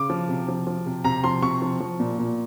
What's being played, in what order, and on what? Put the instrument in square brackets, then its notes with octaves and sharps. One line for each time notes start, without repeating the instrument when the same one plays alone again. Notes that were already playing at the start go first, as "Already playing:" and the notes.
Already playing: [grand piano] C#3 D6
F3
C3
F3
F3
C3
C3 A#5
F3 C6
C3 C#6
F3
F3
A#2
A#2